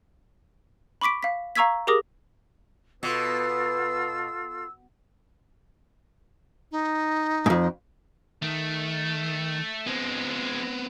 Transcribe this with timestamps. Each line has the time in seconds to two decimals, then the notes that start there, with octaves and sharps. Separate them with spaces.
1.01 B5 C#6 D6 B6 D7
1.23 F5 B6
1.55 F5 A#5 C#6 E6 G#6 B6
1.87 G4 G#4 A#4 D6 D#6 A#6
3.03 B2 B3 F4 A4 E6
6.71 D#4
7.46 F2 G#2
8.42 D#3 A3
9.87 F3 G#3 B3 C4